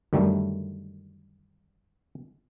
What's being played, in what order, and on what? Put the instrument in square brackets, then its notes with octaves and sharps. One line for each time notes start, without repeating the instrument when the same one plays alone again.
[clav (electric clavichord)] F#2 D3 D#3 G3 A3